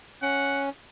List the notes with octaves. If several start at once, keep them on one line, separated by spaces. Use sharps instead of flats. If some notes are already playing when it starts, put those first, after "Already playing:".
C#4 F#5